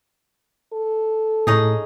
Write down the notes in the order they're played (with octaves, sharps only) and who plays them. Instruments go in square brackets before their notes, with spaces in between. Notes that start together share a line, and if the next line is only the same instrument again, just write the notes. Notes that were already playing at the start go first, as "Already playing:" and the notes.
[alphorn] A4
[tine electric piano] A2 [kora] C#4 D#4 G#4